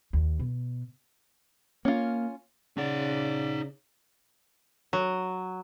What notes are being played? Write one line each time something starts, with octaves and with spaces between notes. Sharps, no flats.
D#2
B2
A#3 C#4 F4
C#3 D#4 D5 F#5
F#3